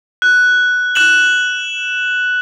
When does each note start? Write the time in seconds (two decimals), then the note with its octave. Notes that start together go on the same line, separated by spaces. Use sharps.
0.22 F#6
0.95 F#6 E7 F#7